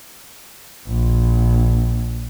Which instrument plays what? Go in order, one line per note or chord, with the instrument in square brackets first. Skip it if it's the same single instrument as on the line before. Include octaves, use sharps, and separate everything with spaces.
[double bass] A#1